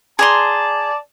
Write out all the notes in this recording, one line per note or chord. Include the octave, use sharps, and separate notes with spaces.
G#4 D5 A5 A#5 C6